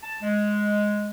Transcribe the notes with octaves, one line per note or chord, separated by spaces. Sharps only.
A5
G#3